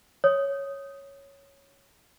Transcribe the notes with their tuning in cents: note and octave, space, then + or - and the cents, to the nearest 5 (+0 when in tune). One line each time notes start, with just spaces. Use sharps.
C#5 +0 D#6 +0